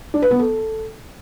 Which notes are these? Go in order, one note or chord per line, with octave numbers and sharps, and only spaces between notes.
D4
B4
B3
A4